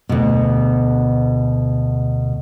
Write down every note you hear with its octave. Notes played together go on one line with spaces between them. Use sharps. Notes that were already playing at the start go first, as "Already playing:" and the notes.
D2 B2